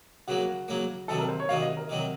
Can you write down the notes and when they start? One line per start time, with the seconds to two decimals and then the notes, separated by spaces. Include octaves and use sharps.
0.27 C#3 F#3 A#3 F#4
0.68 C#3 F#3 A#3
1.08 C3 D#3 F#3 A4
1.19 A#4
1.28 C5
1.40 C#5
1.49 C3 D#3 F#3 F5
1.62 D#5
1.77 A#4
1.89 C3 D#3 F#3